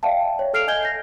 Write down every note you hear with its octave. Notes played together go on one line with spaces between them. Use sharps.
D5 E5 F5 G5 A5
C#5
A4 F6 C7 D7 F7
D#5 G#5 G6 G#6 G7
G6 A#6